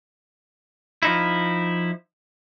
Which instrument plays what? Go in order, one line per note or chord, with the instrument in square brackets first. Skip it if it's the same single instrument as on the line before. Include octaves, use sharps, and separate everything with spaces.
[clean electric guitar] F3 D#4 E4